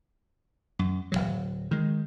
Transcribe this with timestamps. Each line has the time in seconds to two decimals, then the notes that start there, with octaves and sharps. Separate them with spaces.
0.79 F#2
1.12 D1 C#2 F#3
1.71 D#3 G#3